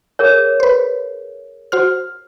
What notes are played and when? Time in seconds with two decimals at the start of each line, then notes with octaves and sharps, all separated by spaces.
0.19 G#4 A#4 C#5
0.60 B4 C5
1.72 F#4 C5 F6